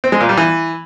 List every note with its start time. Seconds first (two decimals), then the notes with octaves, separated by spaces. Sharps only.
0.04 C4
0.12 G#3
0.21 A#2
0.29 G3
0.37 E3